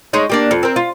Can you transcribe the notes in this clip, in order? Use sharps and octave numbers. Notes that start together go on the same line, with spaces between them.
G#3 D#4 C#5
G3 A#3 D4
F2
C4 A#4
F4